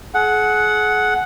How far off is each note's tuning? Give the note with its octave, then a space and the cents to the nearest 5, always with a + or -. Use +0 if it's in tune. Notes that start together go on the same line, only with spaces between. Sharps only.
G#4 +40 F#5 +0